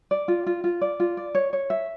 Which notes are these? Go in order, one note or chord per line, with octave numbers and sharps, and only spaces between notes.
D5
F4
F4
F4
D5
F4
D5
C#5
C#5
E5